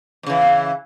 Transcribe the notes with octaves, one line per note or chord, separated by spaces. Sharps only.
F2 C#3 E3